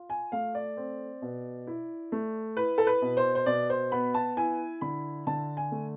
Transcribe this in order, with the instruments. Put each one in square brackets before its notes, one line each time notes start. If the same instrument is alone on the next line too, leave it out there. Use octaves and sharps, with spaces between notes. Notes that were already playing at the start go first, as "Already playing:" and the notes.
Already playing: [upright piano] F4
G#5
A3 F5
D5
C4
B2
E4
A3
E4 B4
A4
B4
B2
C5
C5
B2 D5
C5
B3 B5
A5
E4 G#5
D3 B5
D3 A5
G#5
A3